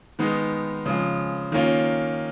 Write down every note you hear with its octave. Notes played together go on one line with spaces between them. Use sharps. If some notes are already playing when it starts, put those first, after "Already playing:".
D#3 G#3 B3 D#4
C#3 F3 G#3
D#3 A#3 C#4 F4